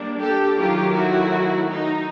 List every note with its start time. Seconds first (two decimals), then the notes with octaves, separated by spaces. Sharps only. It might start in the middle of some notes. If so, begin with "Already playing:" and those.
Already playing: G3 A#3 D4
0.20 G4 A4
0.56 D#3 F#3 A3 F4 G4
0.93 E4 F#4
1.66 D#4